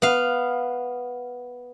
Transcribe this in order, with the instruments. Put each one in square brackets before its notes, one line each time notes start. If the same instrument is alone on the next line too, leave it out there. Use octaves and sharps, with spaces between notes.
[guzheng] B3 F5